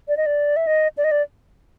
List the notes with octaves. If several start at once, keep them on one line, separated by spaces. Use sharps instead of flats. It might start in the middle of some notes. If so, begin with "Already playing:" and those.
D5
D#5
D5
E5
D#5
D5
D#5
D5